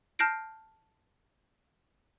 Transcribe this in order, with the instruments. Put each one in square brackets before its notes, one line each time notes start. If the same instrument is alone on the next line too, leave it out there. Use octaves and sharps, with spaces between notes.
[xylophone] A5 F6 G6 A#6 C7 D7